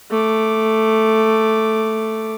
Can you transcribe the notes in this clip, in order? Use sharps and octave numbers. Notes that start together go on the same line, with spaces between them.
A3 D6